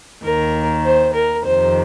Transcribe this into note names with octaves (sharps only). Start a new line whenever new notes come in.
D#2 D#3 A#4
C5
A#4
F2 C3 D#3 C5